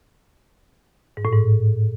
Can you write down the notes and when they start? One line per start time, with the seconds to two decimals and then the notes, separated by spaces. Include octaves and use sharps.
1.17 G#2
1.25 A2
1.32 G#2